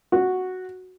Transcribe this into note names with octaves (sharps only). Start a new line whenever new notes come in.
F#4